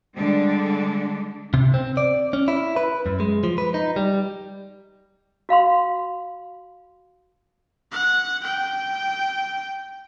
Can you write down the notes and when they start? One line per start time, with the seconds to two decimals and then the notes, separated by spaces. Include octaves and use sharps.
0.15 D3 G3 G#3 D4
1.54 C3
1.74 C4
1.97 D5
2.33 C#4
2.48 E4
2.76 B4
3.06 F#2
3.20 G#3
3.43 F3
3.58 B4
3.74 D#4
3.96 G3
5.49 F#4 F5 B5 C6
7.92 F#5
8.44 G5